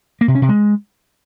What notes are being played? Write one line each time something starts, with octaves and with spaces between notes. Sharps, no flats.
A#3
C3
C#4
C3
G#3